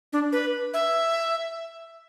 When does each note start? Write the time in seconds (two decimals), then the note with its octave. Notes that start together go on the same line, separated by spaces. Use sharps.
0.13 D4
0.32 B4
0.74 E5